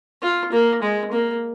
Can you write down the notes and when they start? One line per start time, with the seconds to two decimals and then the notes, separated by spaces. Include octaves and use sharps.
0.22 F4
0.52 A#3
0.82 G#3
1.12 A#3